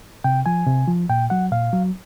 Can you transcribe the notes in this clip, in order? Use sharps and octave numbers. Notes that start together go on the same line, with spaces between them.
C3 G5
F3 G#5
C3
F3
A#2 G5
F#3 F#5
A#2 F5
F#3